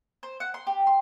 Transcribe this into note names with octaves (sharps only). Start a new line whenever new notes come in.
C5
F#5
C6
G4
C6